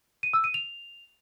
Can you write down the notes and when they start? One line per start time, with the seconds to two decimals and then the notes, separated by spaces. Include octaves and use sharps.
0.23 D#7
0.33 E6
0.44 D#7
0.54 F7